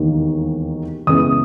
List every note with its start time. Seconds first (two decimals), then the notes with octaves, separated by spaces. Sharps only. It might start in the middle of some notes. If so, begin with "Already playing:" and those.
Already playing: E1 D#2 D#3 A#3
1.07 C#2 C#3 E3 B3 D#6